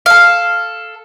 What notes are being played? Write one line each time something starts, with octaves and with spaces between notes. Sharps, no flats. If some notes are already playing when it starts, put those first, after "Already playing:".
A4 F5